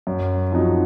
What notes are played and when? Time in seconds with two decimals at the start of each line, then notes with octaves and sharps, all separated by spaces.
0.07 F#2
0.52 F3 C4 D#4 F#4